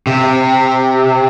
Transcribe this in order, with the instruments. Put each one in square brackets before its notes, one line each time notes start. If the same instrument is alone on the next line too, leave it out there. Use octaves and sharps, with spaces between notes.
[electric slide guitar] C3